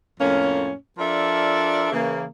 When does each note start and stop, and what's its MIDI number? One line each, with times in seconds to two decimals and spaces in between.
0.19 0.72 41
0.19 0.72 45
0.19 0.72 58
0.19 0.72 61
0.98 1.91 53
0.98 1.91 62
0.98 1.91 69
0.98 1.91 70
0.98 1.91 74
0.98 1.91 76
1.91 2.25 49
1.91 2.25 52
1.91 2.25 58